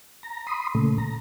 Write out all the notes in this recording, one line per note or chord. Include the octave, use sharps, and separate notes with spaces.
A#5
B5 C6 D#6
A#2 C#3 A3
A#5